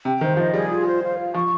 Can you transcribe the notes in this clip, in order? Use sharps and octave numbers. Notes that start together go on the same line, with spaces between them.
C3 G5
D#3 C5
F3 D#5
G3 G#4
F4
C5
F5
F4
F3 C#6